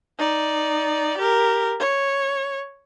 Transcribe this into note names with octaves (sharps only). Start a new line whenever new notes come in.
D#4 D5
G4 A#4
C#5